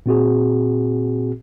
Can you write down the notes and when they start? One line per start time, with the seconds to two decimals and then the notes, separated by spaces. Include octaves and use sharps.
0.06 A#2 C4 F#4 G#4